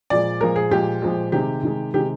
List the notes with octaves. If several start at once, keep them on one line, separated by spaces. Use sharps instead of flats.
A#2 F3 G#3 D5
A#2 F3 G#3 A#4
G#4
A#2 F3 G#3 G4
A#2 F3 G#3
C3 D#3 G#3 G4
C3 D#3 G#3
C3 D#3 G#3 G4